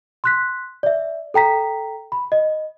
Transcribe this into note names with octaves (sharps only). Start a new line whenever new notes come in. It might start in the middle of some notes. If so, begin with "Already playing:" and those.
C6 F#6 B6
D5 E5
A4 G5 A#5 B6
B5
D#5